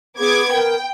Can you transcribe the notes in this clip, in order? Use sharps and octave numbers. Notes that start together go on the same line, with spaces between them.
B3 G#4 D6 G#6
A#4 G5